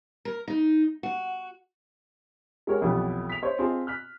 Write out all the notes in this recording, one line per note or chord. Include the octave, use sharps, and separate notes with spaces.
A#4
D#4
F#4
G#3 F#4 G4 A#4 C#5
B1 F2 B2 E3 B3 G4
B6 F7
C5 C#5 D#5
C4 F4 G#4 D#5 A5 C6
F6 F#6 B6